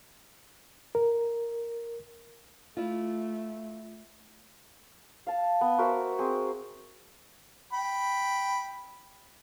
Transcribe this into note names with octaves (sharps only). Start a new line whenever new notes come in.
A#4
A3 E4 F4
F5 A5
B3
F#4 A#4 C5 E5
C4 G#4
G5 B5